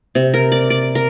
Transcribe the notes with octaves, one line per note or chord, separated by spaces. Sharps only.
C3
A#4
D5
D5
A#4